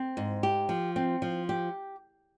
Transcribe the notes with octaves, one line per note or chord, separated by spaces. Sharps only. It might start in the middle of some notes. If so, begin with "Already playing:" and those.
Already playing: C4
G#2
G4
F3
C4
F3
G4